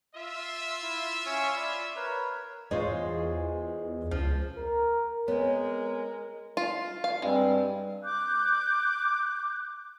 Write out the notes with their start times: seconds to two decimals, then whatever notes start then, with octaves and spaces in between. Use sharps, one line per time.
0.15 F4 E5
0.82 E4
1.26 C#4 C#5 C#6
1.57 D5 B5
1.96 A#4 B4 C#5
2.71 E2 G#3 F4 C5 C#5
4.11 C#2 F3
4.58 A#4
5.28 G#3 B3 C4 A#4 C#5
6.57 F4
7.04 F5
7.22 G2 G3 G#3 C4
8.03 D6 F#6 G6